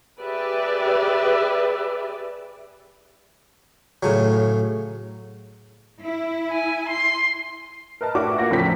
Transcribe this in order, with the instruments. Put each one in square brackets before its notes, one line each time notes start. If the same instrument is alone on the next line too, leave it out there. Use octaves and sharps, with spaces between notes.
[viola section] G4 G#4 B4 D5 E5
[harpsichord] A2 C#3 F#3
[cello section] E4
[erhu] G#5
C6
[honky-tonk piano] A#4 B4 D#5 A5
A2 D4 E4 F#4 D6
A#3 F4 F5 F#5 A#6
E2 A2 C#3 F3 B6